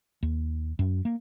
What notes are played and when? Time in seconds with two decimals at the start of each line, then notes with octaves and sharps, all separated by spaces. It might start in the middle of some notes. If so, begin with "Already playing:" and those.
0.23 D#2
0.79 F#2
1.05 A#3